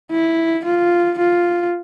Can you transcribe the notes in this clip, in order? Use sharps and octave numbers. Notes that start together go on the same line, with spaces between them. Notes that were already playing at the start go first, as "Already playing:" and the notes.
E4
F4
F4